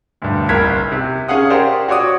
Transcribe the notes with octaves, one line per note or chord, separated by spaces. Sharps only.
D2 G2
F#1 C2 A#4 G#6 B6
C3
C#4 G#4 F5 F#5 D#6
G4 A#4 C5 D5 F5
F#4 C#5 D5 D6 D#6